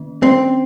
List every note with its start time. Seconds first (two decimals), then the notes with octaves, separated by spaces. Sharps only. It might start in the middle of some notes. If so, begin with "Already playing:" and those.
Already playing: D#3 A#3 C#4
0.23 C4